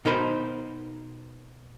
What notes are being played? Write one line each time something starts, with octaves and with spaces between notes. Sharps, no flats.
B2 D#4 A#4 C5 B5